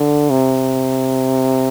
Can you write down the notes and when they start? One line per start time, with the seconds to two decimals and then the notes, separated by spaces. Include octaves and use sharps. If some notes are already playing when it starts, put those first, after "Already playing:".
Already playing: D3
0.30 C3